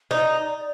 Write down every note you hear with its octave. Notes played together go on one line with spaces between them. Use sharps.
D#4 D5